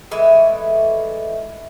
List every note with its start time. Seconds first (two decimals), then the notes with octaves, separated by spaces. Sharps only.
0.11 E3 G#3 A3